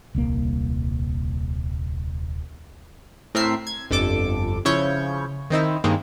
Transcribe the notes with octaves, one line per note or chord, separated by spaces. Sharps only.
D#1 C2 A#3
A2 C4 A#4 E5 C7
G#6
G1 F2 A4 D6
C#3 F3 E4 C#5 C#6 G6
D#3 C4 D#4 E4
G2 D#3 G#3 A#3 C4